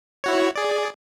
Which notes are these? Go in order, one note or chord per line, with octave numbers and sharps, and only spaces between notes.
E4 F#4 C#5
G#4 D5